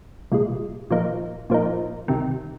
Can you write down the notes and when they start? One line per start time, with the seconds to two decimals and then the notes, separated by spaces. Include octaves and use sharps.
0.32 C2 A#2 G#3
0.91 A#2 F3 A#3 D#4
1.50 A#2 F3 A#3 D#4
2.08 C2 C3 D#3